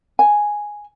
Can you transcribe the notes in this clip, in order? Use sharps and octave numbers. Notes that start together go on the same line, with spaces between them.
G#5